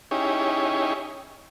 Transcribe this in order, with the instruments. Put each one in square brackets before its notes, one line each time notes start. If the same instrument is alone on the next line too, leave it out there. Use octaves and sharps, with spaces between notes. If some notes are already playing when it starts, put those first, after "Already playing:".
[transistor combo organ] C#4 D#4 E4 G4 G#4 C#5